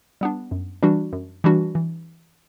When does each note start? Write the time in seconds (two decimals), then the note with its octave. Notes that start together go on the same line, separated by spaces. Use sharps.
0.21 G3 B3 D4
0.51 F#2
0.83 E3 G3 D4 F#4
1.13 F#2
1.44 E3 G3 D4 F#4
1.75 E3